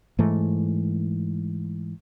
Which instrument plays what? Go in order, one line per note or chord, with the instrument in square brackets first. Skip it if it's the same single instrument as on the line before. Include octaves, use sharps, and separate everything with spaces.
[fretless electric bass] G#2 E3 A3